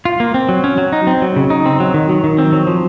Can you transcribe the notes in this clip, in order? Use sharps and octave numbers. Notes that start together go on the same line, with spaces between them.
F4
A#3
C4
F#3
C#4
F#3
D#4
C4
F#3
C#3
D#4
C4
F#3
D#3
F#3
D#3
C4
F#3
F3